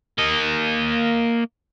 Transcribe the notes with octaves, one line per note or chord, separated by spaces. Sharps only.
A#3 D#5